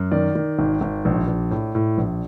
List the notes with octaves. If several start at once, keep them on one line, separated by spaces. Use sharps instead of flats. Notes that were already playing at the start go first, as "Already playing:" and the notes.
Already playing: F#2
D#3 D5
D#3
G#1
G#1
A#1
A#1
A2
A2
A#1